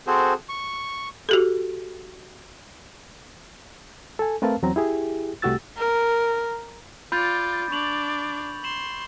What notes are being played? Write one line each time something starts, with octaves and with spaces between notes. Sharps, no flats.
C4 F#4 G#4 A4 C5
C#6
F#4 G4 A4
A4 G#5
A3 C4 A#4 B4 F5 A5
E2 F#3 C4 A#5
E4 G4 G#4
C2 A3 F#4 G4 E6 A6
A#4
F4 D5 B5 G6 A6
D4 D5 C#6 F7 F#7
C6 E7 F#7